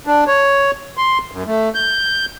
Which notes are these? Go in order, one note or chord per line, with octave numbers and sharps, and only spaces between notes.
D4
C#5
C6
F#2
A3
G6